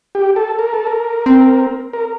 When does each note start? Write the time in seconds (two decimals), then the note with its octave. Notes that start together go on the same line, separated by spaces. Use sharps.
0.15 G4
0.36 A4
0.59 A#4
0.74 A4
0.87 A#4
1.26 C4
1.93 A#4